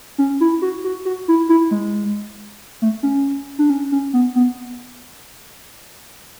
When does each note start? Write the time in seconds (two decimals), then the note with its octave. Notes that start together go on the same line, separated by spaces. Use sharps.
0.18 C#4
0.41 E4
0.62 F#4
0.84 F#4
1.05 F#4
1.28 E4
1.49 E4
1.71 G#3
2.82 A3
3.03 C#4
3.59 D4
3.70 C#4
3.92 C#4
4.13 B3
4.35 B3